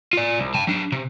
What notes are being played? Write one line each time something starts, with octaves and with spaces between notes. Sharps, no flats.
F4 D5
C2
G5 A5
F#3 D4
C3